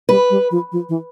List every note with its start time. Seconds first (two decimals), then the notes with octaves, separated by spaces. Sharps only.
0.09 G3 B4
0.30 G3
0.51 F3
0.72 F3
0.89 E3